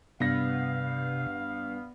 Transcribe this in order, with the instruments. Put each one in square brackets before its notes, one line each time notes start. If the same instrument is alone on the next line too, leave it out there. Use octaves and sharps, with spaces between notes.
[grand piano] G2 A#6 [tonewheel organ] C3 [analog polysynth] B3 [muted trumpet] F5